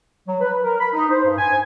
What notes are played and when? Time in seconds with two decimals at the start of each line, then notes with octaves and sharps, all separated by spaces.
0.28 F#3
0.40 B4
0.63 A#4
0.80 B5
0.93 D#4
1.10 C5
1.24 G2
1.38 G#5